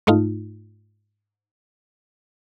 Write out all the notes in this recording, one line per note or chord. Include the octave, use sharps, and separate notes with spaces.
G#2 A3 D#4 F4